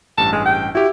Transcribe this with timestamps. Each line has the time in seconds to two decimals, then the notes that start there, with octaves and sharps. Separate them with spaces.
0.18 A1 G2 A5
0.32 G#3
0.46 G5
0.75 E4 F#4 G4